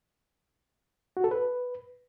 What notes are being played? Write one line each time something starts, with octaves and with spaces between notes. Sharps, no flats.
F#4
A4
B4